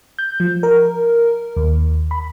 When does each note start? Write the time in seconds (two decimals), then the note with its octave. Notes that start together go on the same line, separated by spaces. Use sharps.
0.19 G6
0.40 F3
0.63 A#4
1.57 D#2
2.11 B5